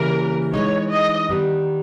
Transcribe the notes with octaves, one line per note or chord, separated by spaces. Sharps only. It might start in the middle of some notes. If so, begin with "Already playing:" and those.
Already playing: C#3 E3 G3 A#3 A#4
E3 G#3 D#4 C#5
D#5
D#3 G3 B3